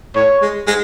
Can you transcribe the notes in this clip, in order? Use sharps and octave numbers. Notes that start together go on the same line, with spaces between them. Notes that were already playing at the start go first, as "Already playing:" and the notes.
A2 C#5
G#3
G#3